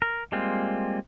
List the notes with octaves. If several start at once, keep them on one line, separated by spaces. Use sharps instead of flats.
A#4
G3 G#3 A#3 C4 F4